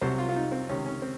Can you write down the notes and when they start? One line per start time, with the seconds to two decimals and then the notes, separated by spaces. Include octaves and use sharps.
0.01 C2 C3 F#3 C5
0.18 F4
0.29 F4
0.36 D#4
0.52 C4
0.69 C#2 C3 D#3 C#4
0.86 C#4
1.02 C4